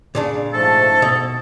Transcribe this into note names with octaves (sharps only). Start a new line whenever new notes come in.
A#2 C#3 D4
G#2 F3 A3 A4
B2